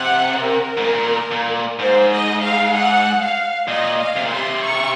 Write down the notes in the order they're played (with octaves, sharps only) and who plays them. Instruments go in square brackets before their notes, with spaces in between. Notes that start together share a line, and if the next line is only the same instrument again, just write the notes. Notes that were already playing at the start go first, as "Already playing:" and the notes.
Already playing: [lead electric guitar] C3 [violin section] F#5
[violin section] A#4
[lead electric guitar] G#2
A#2
A#2
[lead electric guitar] G#2 [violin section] C5
[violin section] D#5
F5
F#5
F5
[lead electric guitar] A#2 [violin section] D#5
[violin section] F5
[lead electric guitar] C3
A#2
[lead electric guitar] C3 [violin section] C6
[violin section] C#6